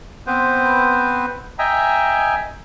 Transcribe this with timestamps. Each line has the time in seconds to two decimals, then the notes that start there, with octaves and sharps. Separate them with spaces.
0.27 B3 C4 B4 C5
1.59 D#5 E5 G5 G#5 A#5